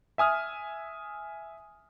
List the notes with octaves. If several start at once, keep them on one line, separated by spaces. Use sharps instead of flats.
E5 G#5 D#6 F6